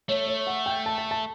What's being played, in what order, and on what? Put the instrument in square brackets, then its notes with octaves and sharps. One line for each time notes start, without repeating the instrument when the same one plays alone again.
[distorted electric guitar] A3 [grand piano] C#5
[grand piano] C#5
F#5
G5
A5
A5
A5